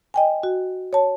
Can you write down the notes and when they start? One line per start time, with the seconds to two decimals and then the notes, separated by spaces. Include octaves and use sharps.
0.14 D#5 G5 G#5
0.43 F#4
0.93 C#5 A5